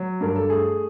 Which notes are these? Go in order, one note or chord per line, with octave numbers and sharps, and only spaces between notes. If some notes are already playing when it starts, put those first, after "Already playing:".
Already playing: F#3
G2 A#4
A4
A3 G#4